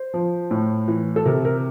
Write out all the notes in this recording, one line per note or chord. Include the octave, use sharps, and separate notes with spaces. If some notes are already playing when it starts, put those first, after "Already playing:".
Already playing: C5
F3
A2
E3
A4
C3 A#4
A#4